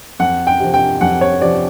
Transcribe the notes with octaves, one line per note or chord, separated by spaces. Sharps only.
F2 F#5
G5
C3 F3
G5
F2 F#5
C#5
C3 F3 D5